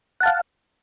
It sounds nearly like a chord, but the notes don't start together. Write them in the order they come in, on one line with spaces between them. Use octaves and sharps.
F#5 A5 F5